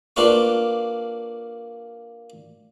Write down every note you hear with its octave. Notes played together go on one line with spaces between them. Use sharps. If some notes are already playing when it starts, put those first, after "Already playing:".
A#3 D4 F4 B4 C#6